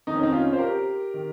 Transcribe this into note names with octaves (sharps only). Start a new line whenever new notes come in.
F2 D#3 D#4
C#4
C4 D#4
C#4 F4
C5
G4 A#4
D#3